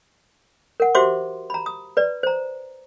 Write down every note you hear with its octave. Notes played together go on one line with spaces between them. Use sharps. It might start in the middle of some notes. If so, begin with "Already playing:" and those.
A#4 F#5
F#4 G4 C5 E5 C6 D6
A#5 B5
D#6
B4 D5
C5 A#5